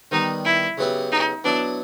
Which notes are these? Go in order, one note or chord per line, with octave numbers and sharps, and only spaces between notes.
D#3 G3 B3 D#4
E4
C#3 F#3 B3 E4 G4
D#4
F#3 B3 D4 E4